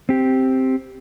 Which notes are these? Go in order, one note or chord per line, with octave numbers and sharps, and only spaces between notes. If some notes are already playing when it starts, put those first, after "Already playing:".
C4 G4